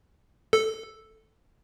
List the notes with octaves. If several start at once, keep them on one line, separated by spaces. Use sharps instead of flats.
A4